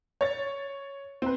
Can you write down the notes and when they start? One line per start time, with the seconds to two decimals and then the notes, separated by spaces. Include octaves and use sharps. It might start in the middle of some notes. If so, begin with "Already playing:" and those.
0.21 C#5 A6
1.22 C4 B4